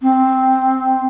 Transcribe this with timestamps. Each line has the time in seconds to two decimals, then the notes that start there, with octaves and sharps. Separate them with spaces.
0.02 C4